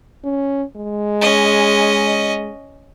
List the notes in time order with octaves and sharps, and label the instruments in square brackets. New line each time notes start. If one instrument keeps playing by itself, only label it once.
[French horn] C#4
G#3
[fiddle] C#4 D#5